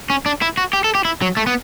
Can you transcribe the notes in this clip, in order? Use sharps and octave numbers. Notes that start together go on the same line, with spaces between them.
C#4
D4
E4
F#4
G4
A4
G4
E4
F#3
A3
B3